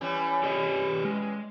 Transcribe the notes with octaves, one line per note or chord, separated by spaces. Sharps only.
E3 G3 C#4
G4 D5 D#5
G#3